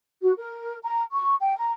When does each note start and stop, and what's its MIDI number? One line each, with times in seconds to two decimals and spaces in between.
0.23 0.33 66
0.37 0.78 70
0.84 1.03 82
1.13 1.36 85
1.41 1.56 79
1.58 1.71 82